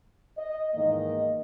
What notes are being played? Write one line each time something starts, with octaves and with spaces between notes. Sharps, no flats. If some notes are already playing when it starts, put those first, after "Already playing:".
D#5
E2 G#2 D#3 A#3 D#5